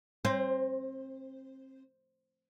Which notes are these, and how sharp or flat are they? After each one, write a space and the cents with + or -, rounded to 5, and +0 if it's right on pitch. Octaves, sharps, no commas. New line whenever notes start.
C4 +30 C5 +0